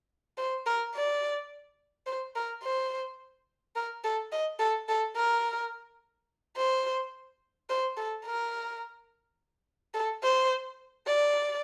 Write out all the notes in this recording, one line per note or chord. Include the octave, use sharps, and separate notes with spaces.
C5
A#4
D5
C5
A#4
C5
A#4
A4
D#5
A4
A4
A#4
C5
C5
A4
A#4
A4
C5
D5